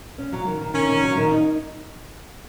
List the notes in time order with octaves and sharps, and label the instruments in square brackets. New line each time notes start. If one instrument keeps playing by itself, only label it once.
[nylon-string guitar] C#4
F#3
D#3
D#3
[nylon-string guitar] D#3 [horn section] C#4
[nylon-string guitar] D#3
F#3
D#3
D#4